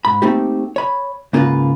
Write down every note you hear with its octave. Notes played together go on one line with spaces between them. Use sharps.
G#2 B5
A3 A#3 C4 D#4 G4
C#5 B5
G#2 C#3 A#3 F4 A#4 B4